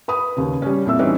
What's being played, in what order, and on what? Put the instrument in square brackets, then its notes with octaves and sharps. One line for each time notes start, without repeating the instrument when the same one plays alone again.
[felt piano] B4 B5 D#6
D#2 C#3
G3 C#4
F2 A#2 E4 E6
E3 G3 C4 C#4 D#4 E4